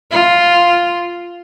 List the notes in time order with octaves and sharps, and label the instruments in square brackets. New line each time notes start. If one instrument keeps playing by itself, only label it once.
[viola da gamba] F4